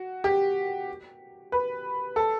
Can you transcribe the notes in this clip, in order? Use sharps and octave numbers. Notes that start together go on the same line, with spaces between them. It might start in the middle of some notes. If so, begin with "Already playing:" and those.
Already playing: F#4
G4
B4
A4